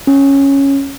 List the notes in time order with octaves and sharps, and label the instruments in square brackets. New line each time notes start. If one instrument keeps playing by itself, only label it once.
[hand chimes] C#4